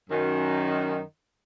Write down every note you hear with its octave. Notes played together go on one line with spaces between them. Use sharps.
F#2 D#3